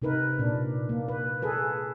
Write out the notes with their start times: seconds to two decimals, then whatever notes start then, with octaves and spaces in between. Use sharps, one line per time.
0.02 C3 D#4 A#4 B4
0.39 A#2 D4
0.89 A#3
1.08 B4
1.42 G#4 A4 B4